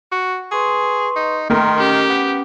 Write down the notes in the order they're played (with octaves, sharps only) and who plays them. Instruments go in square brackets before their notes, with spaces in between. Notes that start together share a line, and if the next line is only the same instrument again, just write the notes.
[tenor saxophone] F#4
[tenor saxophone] G#4 [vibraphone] B4 C6 C#6
[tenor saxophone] D#4
[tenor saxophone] D#3 [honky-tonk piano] A3 A#4 [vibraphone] G5 A#5 C6
[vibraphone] C#4 [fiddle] G4
[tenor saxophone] B3